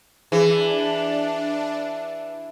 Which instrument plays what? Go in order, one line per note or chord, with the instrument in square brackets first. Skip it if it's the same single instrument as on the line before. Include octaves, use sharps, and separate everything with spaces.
[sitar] E3 [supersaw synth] D4 [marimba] G#4